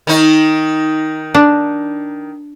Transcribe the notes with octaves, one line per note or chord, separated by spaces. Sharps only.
D#3 D#4
D4